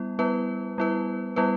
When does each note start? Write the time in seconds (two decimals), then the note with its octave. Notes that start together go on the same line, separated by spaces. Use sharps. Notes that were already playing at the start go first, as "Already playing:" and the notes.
Already playing: G3 B3 E4
0.19 G3 B3 E4 B4
0.78 G3 B3 E4 B4
1.36 G3 B3 E4 B4